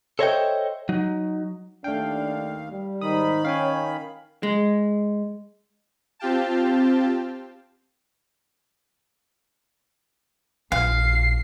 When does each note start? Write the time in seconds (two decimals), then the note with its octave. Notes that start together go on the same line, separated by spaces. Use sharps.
0.19 A4 C5 C#5 D#5 E5 G5
0.89 F#3 D#4
1.84 D#2 A3 D4 F5 G5
2.71 G3
3.02 G#2 D#3 D#4 B5 D#6
3.45 C#4 C#5 F5 G5 G#5
4.43 G#3
6.19 C4 F4 G4 F5 G5 A5
10.72 A#1 F5 C7